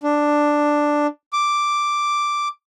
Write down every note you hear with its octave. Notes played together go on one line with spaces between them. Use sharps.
D4
D6